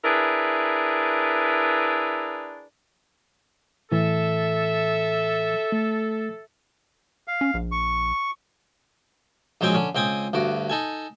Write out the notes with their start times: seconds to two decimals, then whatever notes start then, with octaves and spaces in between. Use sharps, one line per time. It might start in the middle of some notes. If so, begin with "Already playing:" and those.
0.03 D4 E4 G#4 A#4 B4
3.92 A2 E3 A4 E5
5.72 A3
7.28 F5
7.41 C#4
7.54 A#1
7.72 C#6
9.61 A#1 F#3 G#3 C4 G5 G#5
9.74 D3 C#4
9.95 C#2 C4 G5 G#5 D#6
10.33 D2 G2 F#4 D6
10.70 D#4 A4 G#5